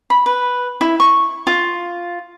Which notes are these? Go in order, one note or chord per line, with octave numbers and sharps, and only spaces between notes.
B5
B4
E4
C#6
F4